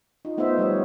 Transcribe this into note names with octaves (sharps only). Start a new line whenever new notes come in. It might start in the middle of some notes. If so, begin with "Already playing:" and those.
D#4 F4
A3 B3 D#4 F4 C5 E5
F3 G3 G4 C#5